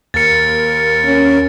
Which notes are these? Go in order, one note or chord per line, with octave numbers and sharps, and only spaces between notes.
D#2 A#4 A6 C#7
C#4